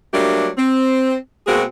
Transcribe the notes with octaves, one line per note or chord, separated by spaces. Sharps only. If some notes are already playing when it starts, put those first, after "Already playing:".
F#3 G3 A3 A#3 D4 G4
C4
B2 G#3 A#3 C4 F#4 G#4